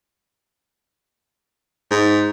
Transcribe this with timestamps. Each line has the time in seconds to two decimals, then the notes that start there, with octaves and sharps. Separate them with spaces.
1.91 G#2